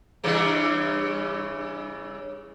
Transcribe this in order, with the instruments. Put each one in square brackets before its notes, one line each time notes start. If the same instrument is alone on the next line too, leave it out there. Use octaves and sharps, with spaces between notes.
[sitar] G2 C#3 E3